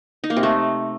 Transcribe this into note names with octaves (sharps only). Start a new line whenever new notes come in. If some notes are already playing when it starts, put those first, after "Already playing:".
D#4
A#3
C3
A3